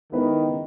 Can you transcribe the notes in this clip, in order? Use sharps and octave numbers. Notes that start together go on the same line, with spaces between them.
D#3 G#3 B3 E4 B4
C#3